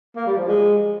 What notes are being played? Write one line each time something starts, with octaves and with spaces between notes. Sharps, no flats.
A#3
G3
F3
G#3